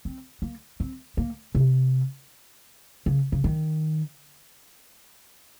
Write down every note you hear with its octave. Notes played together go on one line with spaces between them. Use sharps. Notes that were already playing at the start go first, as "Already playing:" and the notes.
C4
A#3
C4
A#3
C3
C#3
C#3
D#3